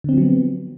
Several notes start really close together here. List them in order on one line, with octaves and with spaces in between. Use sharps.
D3 C4 F3 F#3 B3